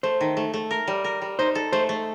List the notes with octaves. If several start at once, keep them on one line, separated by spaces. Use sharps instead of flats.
A3 C5
D#3
A3
A3
A#4
G3
A#4
G3
D#4 C5
A4
A3 C5
A3